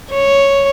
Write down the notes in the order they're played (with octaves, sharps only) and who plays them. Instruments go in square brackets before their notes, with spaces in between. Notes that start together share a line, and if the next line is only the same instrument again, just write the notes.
[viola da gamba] C#5